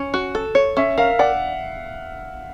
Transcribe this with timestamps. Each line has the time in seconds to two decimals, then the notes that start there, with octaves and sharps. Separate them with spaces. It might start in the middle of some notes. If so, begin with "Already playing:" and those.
Already playing: C#4
0.14 F#4
0.35 A4
0.55 C#5
0.77 C#4 E5
0.98 A#4 F5
1.19 D5 F#5